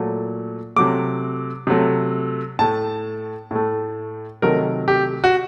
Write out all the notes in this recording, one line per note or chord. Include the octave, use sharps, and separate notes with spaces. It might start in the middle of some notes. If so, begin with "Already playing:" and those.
Already playing: A#2 F#3 A3
C3 F#3 A3 D6
C3 F#3 A3
A2 A3 A5
A2 A3
C3 D#3 F#3 A3 A#4
G4
F#4